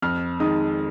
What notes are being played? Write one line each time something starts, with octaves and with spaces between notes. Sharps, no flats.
F2 F6
D#3 G#3 D#4 D#6